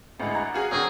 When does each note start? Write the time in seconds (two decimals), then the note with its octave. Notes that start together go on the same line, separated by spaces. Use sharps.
0.20 A1 D2 G#3 E4
0.35 F#5 A#5
0.54 F#4 G#4 F5
0.71 D2 F#3 C4 F#4 G#4 A#4